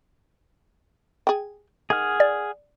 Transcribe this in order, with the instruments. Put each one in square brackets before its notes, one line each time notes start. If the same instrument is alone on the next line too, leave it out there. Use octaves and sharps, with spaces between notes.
[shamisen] G#4 G5
[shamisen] D#3 [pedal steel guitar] G#4 F#5 F6
[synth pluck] D5